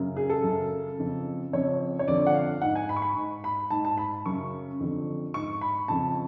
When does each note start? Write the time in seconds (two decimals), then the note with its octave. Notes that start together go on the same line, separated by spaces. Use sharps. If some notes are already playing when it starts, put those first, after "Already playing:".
Already playing: F#2 C#3
0.16 G#4
0.30 A4
0.43 F#2 C#3
0.99 F2 C#3
1.53 F2 C#3 C#5
1.99 C#5
2.08 F2 D3 D5
2.27 F#5
2.34 F5
2.62 G#2 F#5
2.75 G#5
2.89 B5
2.96 C#6
3.02 B5
3.16 G#2
3.44 B5
3.70 G#2 A5
3.85 A5
3.98 B5
4.26 F#2 C#3 C#6
4.80 F2 D3
5.34 G#2 C#6
5.61 B5
5.88 F2 C#3 A5